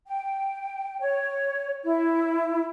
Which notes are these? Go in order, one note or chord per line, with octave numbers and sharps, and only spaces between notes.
G5
C#5
E4